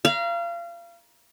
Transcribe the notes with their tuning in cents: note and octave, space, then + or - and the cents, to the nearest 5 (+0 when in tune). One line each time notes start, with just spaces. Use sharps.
F5 -30 A#5 +30